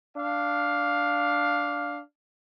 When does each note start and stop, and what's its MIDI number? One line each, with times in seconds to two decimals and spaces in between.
0.16 2.00 62
0.16 2.00 77